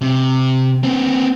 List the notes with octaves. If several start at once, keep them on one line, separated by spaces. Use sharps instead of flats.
C3
B3 C4